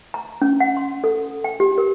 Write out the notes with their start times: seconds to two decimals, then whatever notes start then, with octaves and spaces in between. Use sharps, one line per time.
0.14 A#5
0.42 C#4
0.60 F#5
0.77 C6
1.04 A4
1.44 G5
1.60 G4
1.78 A#4